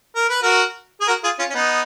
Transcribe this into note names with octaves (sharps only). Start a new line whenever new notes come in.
A#4
B4
F#4 A#4
G#4
F#4 A#4
F4 G#4
C#4 F4
C#4
B3 D#4